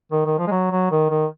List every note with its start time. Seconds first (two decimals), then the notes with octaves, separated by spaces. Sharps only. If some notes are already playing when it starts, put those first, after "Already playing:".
0.12 D#3
0.26 D#3
0.39 F3
0.47 G#3
0.51 F#3
0.71 F#3
0.91 D#3
1.10 D#3